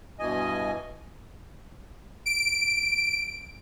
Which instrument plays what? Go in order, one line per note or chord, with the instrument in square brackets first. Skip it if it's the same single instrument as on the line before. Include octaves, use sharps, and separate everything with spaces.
[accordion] G2 B2 E3 D#5 G#5
[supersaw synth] D7